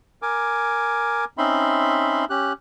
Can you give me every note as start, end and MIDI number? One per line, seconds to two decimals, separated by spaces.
0.22 1.25 70
0.22 1.25 80
0.22 1.25 86
1.38 2.25 60
1.38 2.25 61
1.38 2.25 63
1.38 2.25 76
1.38 2.25 83
1.38 2.25 84
2.30 2.53 61
2.30 2.53 67
2.30 2.53 90